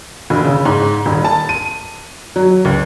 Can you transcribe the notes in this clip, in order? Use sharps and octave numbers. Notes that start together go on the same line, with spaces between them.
E1
C#3
G#2
D#1
A5
D#7
F#3
C#2